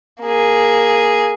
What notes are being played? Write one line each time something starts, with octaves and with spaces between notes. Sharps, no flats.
A#3 G#4